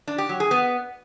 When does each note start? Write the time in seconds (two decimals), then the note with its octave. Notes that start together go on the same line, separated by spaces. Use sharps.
0.08 D4
0.18 G4
0.29 F#3
0.40 G#4
0.51 B3